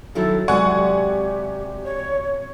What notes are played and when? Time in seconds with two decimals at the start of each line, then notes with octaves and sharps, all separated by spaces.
0.15 D#3 F#3 E4 A4
0.48 C3 F#3 G#3 D5 F#5 G#5 C6 C#6
0.76 G4
1.84 C#5